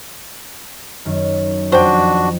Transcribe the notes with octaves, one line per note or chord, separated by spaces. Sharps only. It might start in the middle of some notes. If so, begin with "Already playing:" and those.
F#2 D#3
F2 D4 F#4 C5 G5